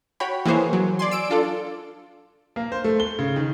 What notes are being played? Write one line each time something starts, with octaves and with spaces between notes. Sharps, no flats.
F#4 C#5 G5 B5
E3 A#3 G#4 C5 C#5
F#3
D5 G#5 C6
E6 D7
D4 F4 A4 D5
A#3
C5
A3
G7
C#3
D#3